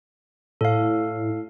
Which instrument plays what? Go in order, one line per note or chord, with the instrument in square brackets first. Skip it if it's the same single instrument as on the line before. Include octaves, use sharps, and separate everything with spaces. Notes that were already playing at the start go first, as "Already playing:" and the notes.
[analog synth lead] A2 [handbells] A4 F5